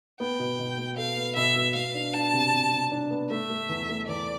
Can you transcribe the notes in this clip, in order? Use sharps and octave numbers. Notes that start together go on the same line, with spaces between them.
B3 G5
B2
B2
B3
A4 F5
B3
B2 E5
B2
B3 F5
D4
D4 A5
C3
C3
C3
D4
B3
A3 E5
A3
E2
A3
E2 D5